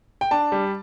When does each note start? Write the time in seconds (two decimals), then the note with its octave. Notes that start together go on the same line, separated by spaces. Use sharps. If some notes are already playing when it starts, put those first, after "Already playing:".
0.21 G5
0.31 D4 A5
0.52 G3